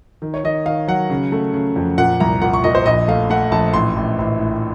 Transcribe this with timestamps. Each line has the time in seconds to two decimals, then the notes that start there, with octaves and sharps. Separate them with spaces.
0.22 D#3
0.34 C#5
0.44 D#3 D#5
0.66 D#3 F5
0.88 F#3 F#5
1.10 C#3
1.32 A3
1.54 C#3
1.76 F2
1.98 A#2 F#5
2.20 C2 A#5
2.42 A#2 F#5
2.53 C#6
2.64 A#2 D#5
2.75 C5
2.86 A#1 D#5
3.08 A3 F5
3.30 A3 F#5
3.52 A#1 A5
3.74 A1 C6
3.96 A1
4.19 A1
4.40 A2